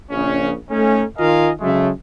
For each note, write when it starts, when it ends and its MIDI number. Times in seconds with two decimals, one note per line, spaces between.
0.11 0.53 34
0.11 0.53 49
0.11 0.53 61
0.70 1.03 57
0.70 1.03 61
0.70 1.03 63
1.17 1.51 51
1.17 1.51 65
1.17 1.51 70
1.17 1.51 75
1.17 1.51 77
1.17 1.51 80
1.61 1.89 49
1.61 1.89 54
1.61 1.89 56
1.61 1.89 57